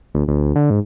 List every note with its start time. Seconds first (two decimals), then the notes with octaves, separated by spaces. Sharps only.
0.15 D2
0.28 D2
0.56 D3
0.70 G#2